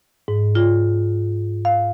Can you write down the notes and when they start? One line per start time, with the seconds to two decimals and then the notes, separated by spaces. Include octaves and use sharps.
0.28 G#2
0.55 F4
1.65 F5